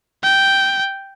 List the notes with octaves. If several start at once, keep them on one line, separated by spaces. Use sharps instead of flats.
G5